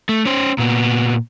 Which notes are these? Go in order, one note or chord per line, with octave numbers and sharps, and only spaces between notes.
A3
C#4 C5
A#2 B3